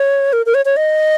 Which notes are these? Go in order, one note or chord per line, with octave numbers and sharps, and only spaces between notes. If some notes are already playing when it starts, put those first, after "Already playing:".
Already playing: C#5
A#4
A#4
C#5
C#5
D#5